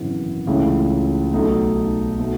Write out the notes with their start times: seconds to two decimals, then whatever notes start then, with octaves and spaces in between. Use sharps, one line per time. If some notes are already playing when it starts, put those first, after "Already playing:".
Already playing: G#1 F#2 C#3 E3 B3
0.47 C#2 C#3 E3 A3
1.33 B1 B2 A3 D#4 A4
2.19 B2 A3